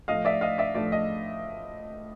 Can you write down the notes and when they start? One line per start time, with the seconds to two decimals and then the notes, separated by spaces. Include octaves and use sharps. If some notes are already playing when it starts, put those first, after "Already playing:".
0.08 A2 F3 A3 D#5 F5
0.25 D5 E5
0.41 D#5 F5
0.58 D5 E5
0.75 A2 F3 A3 D5
0.92 D#5